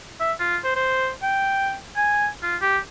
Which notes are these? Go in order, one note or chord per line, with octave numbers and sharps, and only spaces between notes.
E5
F4
C5
C5
G5
G#5
F4
G4